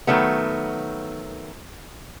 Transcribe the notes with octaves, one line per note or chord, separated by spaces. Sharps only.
D#3 F#3 A3 B3